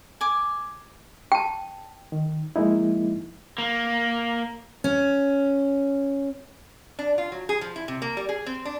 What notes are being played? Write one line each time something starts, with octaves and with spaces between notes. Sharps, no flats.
G#5 D6
G5 A5
D#3
F3 G#3 A#3 D#4 E4
A#3
C#4
D4
F4
F#3
G#4
F3
E4
C3
A#3
G3
G#4
C4
D4